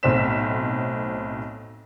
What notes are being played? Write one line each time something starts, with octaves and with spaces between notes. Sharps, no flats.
B1 A2 C4 C5 B6 E7